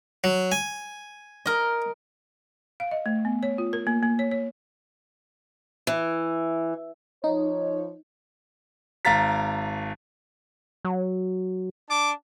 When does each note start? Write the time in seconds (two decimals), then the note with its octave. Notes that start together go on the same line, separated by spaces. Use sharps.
0.24 F#3
0.52 G#5
1.46 A#4 D#5
2.80 F5
2.91 D#5
3.06 A3
3.25 B3
3.43 C#5
3.58 F4
3.73 A#4
3.87 A#3
4.03 A#3
4.19 C#5
4.32 C#5
5.87 E3
7.24 F3 D#4 C#5
9.05 G#1 F5 A#5 A6 B6
10.85 F#3
11.90 D4 A5 D6